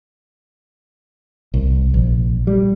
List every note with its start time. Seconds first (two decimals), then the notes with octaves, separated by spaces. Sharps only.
1.54 C2
1.94 A#1
2.47 G3